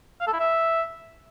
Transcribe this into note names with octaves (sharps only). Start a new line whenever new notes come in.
F5
A4
E4
E5